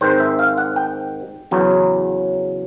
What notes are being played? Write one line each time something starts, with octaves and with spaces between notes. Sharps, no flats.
G#2 D#3 G#3 C4 C5
E5
F5
F#5
G5
E2 C#3 F#3